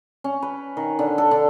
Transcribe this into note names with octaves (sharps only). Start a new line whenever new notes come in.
C#4
B4
D#3
D3
A4
D3